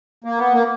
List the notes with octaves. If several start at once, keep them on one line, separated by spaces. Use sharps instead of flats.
A#3
B3
A#3